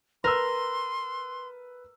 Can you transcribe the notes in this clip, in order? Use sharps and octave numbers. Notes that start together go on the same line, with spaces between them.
A#4 B4 C6 E6